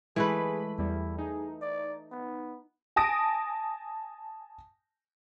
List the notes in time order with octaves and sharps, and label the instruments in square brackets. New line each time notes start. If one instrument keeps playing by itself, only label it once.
[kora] E3 A3 B4 [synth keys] G#3 B5 [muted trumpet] G#4
[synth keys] E2 G3 [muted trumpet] E4
[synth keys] D#4 [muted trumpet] G#4
[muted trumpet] D5
B3
[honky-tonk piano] G#5 A5 D#6 A#6 D7